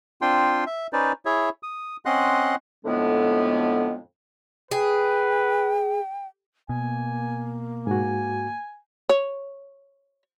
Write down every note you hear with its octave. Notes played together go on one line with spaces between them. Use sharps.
C4 D4 F4 G5 C6
E5
C#4 D#4 B4 C5 D5
E4 G#4 C#5 E5
D#6
C4 C#4 D#5 F#5 C6 F#6
F2 A2 D3 G#3 B3
G#4 B4 G5
B2 A#3 G#5
G#2 F#4 G#5
C#5